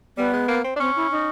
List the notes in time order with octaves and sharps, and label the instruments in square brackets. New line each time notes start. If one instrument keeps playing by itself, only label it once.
[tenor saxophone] G3 [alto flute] B3
[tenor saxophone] G#3
A#3
C4
D4
[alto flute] C4 [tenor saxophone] C#4
[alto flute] E4
D#4